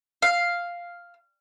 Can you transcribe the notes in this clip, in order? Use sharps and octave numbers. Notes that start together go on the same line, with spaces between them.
F5